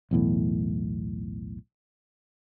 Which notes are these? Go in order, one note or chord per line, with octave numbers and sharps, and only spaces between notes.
B1 E2 A2